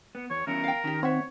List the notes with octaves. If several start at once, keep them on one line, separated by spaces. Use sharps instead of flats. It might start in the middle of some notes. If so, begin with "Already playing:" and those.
B3
E2 C#5
E3 B3 C#4 A#4
F5 G5
D#3 C#4 G4
C4 C#5 E5 F#5